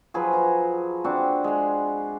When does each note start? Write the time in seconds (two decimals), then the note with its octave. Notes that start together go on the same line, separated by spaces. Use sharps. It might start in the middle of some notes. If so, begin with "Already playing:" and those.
0.14 F3 F#3 G#4 B4
0.33 A#5
1.04 C4 D4 F#4
1.44 G#3 C6